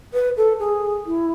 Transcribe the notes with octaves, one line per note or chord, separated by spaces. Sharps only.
B4
A4
G#4
E4